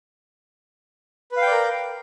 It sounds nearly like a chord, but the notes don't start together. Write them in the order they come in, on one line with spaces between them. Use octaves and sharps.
B4 F5 G5 D5 A#4